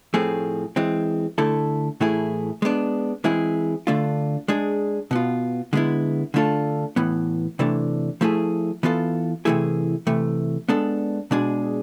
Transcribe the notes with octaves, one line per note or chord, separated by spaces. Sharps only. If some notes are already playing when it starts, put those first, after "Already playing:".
A2 F3 A3 C4 G#4
E3 G#3 C4
D3 A3 E4 A4
A2 E3 A3 E4 G#4
G#3 B3 D4
E3 G#3 C4 E4 G#4
D3 A3 D4 F4
G#3 D4 G#4
B2 B3 F4
D3 G#3 B3 E4
D3 A3 D4 F4 A4
A2 E3 B3
C3 E3 A3 D4
F3 A3 E4 G#4
E3 B3 F4 A4
C3 E3 A3 E4 G#4
C3 E3 A3
G#3 B3 D4 A4
B2 G#3 D4 G#4